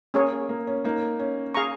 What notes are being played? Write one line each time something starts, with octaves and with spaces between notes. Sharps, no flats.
A#3 C#4 G#4 C#5
A#3
C#4
A#3 D#4
C#4
G#4 F5 A#5 C#6